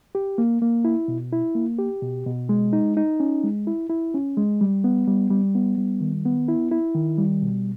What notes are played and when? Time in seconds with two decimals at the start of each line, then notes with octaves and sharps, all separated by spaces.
0.15 G4
0.38 A#3
0.62 A#3
0.85 E4
1.08 B2
1.33 E4
1.55 A#3
1.78 G4
2.02 B2
2.27 B2
2.49 G#3
2.73 D#4
2.97 D#4
3.20 C#4
3.44 G#3
3.67 E4
3.90 E4
4.14 C#4
4.37 G#3
4.61 G3
4.84 B3
5.08 G3
5.30 G3
5.55 B3
5.77 G3
6.01 D#3
6.25 B3
6.48 E4
6.71 E4
6.95 D#3
7.18 G3
7.42 B2